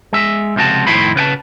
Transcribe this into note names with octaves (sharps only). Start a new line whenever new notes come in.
G#3 E5
C#2 C3 F3 F#4 A5
F2 A2 D#3 E4 C5 B5
C#3 B4 G5 A5